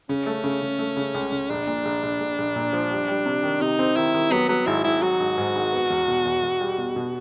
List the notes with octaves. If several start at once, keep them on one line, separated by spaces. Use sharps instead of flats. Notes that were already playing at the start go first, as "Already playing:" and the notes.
C#3 C#4
A3
C#3
C#3
A3
C#3
C#2
C#2
A#1 D4
A#2
A#1
A#1
A#1
A#1
A#2
F3
G3
G3
C3
D#3
C3 D#4
C4
D#3 E4
D#3
F#3 B3
F#3 B3
G#1 E4
G#1 E4
F#3 F#4
G#1
G#2
G#1
B3
E2
B2
E2
E2
G3
B2
B2